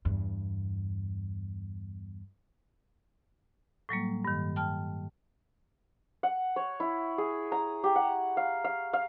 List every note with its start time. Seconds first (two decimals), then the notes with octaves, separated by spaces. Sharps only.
0.05 E2 G2
3.89 A2 F#3 G3 A#3
4.25 G2 D#3
4.56 G5 A5 F6
6.23 F#5
6.56 C#5
6.80 E4
7.18 G#4
7.52 A#5
7.84 G4
7.96 F#5
8.37 F5
8.64 F5
8.93 F5